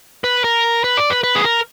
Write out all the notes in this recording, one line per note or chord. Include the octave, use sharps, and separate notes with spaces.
B4
A#4
B4
D5
B4
B4
G#4
A#4